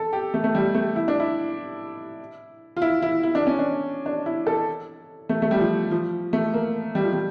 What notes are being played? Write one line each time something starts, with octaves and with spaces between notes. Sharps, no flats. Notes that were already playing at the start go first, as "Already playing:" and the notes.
Already playing: A4
G4
A3
A3
G3
A3
E4
D4
E4
F4
E4
E4
E4
D4
C#4
D4
D4
E4
A4
A3
A3
G3
F3
F3
A3
A#3
G3
F3
G3